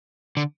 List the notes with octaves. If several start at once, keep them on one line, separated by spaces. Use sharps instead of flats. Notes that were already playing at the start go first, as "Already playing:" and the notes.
D3